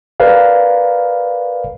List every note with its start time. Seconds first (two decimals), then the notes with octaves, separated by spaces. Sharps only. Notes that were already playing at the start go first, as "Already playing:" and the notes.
0.20 A#4 B4 D5 F5